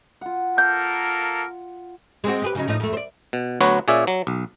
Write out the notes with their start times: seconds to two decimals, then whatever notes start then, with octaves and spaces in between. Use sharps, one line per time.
0.21 F4 F#5
0.58 A#3 A4 A#4 G6
2.24 G#3 C4 F#4
2.42 G4 G#4 B4
2.55 C#3 F#3 D#4
2.68 A2 F3 D#4
2.80 F2 A3
2.93 C5 D5
3.33 B2
3.61 D2 F#3 B3 F#4 B4 C#5
3.88 A#2 C#4 G#4 D5 E5
4.07 F#3
4.27 B1